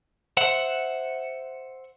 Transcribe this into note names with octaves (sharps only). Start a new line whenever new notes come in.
C5 E5 F#5